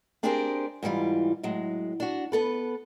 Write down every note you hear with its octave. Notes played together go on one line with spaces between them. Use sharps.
C4 D4 G4 G#4 A#4 C5
G#2 E3 G3 F4
A2 F#3 G#3
D4 F#4
B3 A4 B4